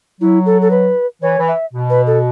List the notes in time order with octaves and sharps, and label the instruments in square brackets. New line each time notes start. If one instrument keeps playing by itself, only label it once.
[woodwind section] F#3 [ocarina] E4
[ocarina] A4
A4
B4
[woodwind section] E3 [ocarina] C#5
[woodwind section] E3
[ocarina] E5
[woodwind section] B2
[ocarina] B4
A4